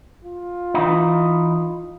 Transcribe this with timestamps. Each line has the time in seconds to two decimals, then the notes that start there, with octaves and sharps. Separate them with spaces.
0.24 F4
0.74 E3 D#4